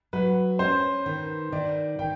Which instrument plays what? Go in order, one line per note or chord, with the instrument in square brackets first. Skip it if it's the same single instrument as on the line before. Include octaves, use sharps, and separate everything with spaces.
[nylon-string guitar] F#3 [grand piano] B4
[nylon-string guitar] C#4 [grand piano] C5
[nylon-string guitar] D#3
[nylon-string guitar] D#3 [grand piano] D5
[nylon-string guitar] D#3 [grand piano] G5